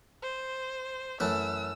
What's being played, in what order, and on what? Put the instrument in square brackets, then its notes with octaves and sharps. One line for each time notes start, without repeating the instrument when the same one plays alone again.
[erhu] C5
[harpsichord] F#2 E3 A3 [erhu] E6